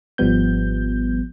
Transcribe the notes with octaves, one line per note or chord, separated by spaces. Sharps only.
G#1 F3 G3 B3 G6